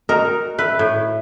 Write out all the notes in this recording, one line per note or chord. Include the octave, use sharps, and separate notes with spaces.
D#4 F#4 A#4 F6
B4 E5
A2